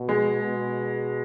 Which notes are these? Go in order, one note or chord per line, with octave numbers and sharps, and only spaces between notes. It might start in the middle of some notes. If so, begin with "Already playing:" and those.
Already playing: B2
G#3
B2